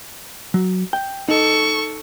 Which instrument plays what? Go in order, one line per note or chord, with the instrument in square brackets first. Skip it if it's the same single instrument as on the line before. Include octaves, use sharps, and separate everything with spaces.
[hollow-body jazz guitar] F#3
G5
[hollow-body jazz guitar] D#4 [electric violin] A4 C#6